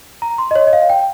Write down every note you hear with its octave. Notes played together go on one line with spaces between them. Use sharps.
A#5
C6
D#5
C#5
D#5
F5
G5